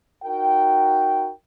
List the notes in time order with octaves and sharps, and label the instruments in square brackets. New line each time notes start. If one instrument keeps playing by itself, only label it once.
[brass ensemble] D#4 F#4 A#4 G5